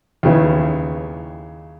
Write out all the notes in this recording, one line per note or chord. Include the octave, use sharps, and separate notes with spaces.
D#2 C#3 E3